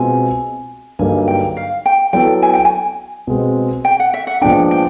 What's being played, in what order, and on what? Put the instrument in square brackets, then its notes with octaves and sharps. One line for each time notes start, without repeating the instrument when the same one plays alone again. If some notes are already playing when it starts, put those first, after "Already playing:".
Already playing: [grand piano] B2 G#3 C4 F4 [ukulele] G#5
[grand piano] G2 D3 F#3 A#3 D#4 [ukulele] G#5
[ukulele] G5
F5
G5
[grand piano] F#3 B3 E4 A4 [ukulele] G5
[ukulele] G#5
G5
G#5
[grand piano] B2 G#3 C4
[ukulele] G5
F#5
E5
F#5
[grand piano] A#2 F3 G#3 B3 D4 [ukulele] G5
[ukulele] G5